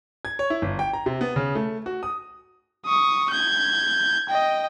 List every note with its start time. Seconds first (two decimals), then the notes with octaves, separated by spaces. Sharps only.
0.25 G#6
0.39 C#5
0.50 E4
0.62 G1
0.79 G5
0.93 A#5
1.06 C3
1.21 B3
1.36 C#3
1.55 A3
1.86 F#4
2.03 D#6
2.86 C#6 D#6
3.30 G6 G#6
4.29 D#5 G5